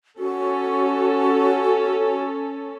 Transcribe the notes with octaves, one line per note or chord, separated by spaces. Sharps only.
C#4 F#4 A4